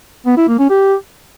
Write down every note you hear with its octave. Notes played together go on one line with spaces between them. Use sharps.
B3
E4
A#3
C#4
G4